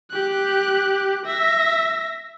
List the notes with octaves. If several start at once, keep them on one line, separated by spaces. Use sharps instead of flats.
G4 F#6
E5 A#6